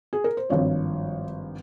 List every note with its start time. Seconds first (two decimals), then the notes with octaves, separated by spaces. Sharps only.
0.13 G#4
0.24 A#4
0.37 C5
0.49 G#1 G2 F3 C#5